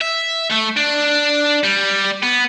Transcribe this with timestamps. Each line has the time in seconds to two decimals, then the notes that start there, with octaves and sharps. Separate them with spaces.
0.01 E5
0.50 A3
0.77 D4
1.64 G3
2.23 B3